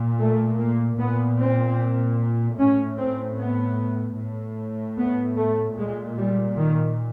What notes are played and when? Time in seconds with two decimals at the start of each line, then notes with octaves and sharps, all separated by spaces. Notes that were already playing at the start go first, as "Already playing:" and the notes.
Already playing: A#2
0.20 A3
0.59 A#3
0.99 A#2 B3
1.39 C4
2.58 A2 C#4
2.98 C4
3.38 B3
4.18 A2
4.98 B3
5.37 A3
5.77 A#2 G#3
6.17 G3
6.57 D#3